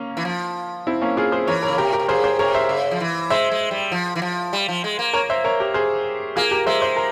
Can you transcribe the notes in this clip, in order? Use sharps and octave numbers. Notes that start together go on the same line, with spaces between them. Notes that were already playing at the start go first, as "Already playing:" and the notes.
Already playing: A#3 C#4
E3
F3
C4 E4
A#3 C#4
F4 G#4
G#4 C5
E3 A#4 C#5
A#4 C#5
C#3
C3 G4 A#4
G4 A#4
C3
C#3 G#4 C5
G#4 C5
C3 A#4 C#5
C5 E5
C#3
F3
E3
G#3 C5 E5
G#3
G3
F3
E3
F3
G3
F3
G#3
A#3
A#4 C#5
C5 E5
A#4 C#5
G4 A#4
G#4 C5
A#3 F4 G#4
G4 A#4
G#3 C5 E5
C5 E5
A#4